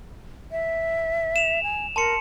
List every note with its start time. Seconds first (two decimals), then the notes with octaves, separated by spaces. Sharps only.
0.52 E5
1.36 E7 F7
1.63 G#5
1.96 A#4 A5 C6 C#7